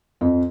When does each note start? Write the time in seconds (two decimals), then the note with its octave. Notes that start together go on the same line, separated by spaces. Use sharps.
0.21 F2